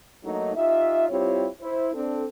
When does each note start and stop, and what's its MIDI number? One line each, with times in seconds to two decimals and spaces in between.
0.24 0.54 54
0.24 0.54 57
0.24 0.54 58
0.24 0.54 63
0.56 1.04 63
0.56 1.04 65
0.56 1.04 67
0.56 1.04 76
1.09 1.47 55
1.09 1.47 60
1.09 1.47 64
1.09 1.47 65
1.09 1.47 67
1.09 1.47 73
1.62 1.89 64
1.62 1.89 72
1.94 2.25 60
1.94 2.25 62
1.94 2.25 69